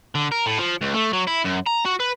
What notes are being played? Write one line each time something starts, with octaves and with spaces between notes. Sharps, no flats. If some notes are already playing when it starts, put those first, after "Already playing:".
D3
A#4
A2
F3
C#2
A3
F#3
E4
F#2
A#5
F#4
B4